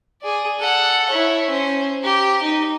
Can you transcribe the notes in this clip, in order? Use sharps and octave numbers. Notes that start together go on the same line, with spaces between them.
G#4 D5
A4 F#5
E4 C#5
C#4 C5
G4 A#5
D#4